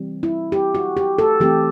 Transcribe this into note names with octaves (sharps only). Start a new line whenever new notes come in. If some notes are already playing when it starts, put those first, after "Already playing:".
Already playing: E3 G3 C4
E4
G4
F#4
G4
A4
E3 A3 C4 G4